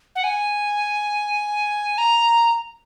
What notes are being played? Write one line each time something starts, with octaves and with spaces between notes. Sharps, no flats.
F#5
G#5
A#5